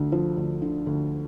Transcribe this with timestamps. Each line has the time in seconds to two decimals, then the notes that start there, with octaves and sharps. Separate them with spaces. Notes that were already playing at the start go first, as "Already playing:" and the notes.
Already playing: D2 D3
0.12 F3
0.37 D2
0.62 D3
0.87 D2